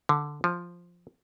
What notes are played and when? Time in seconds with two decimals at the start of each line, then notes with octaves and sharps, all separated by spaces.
0.09 D3
0.44 F3